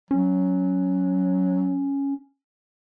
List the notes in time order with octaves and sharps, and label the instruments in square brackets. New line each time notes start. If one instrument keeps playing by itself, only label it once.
[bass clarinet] F#3 [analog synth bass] C#4